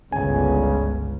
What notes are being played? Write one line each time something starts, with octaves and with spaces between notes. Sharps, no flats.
G1 C#2 C#3 G#5